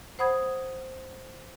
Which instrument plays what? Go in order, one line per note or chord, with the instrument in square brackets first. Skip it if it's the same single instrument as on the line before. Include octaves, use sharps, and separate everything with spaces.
[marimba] C5 F#5 B5 D#6 G#6